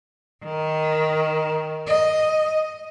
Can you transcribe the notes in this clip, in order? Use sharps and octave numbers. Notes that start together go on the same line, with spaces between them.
D#3
D#5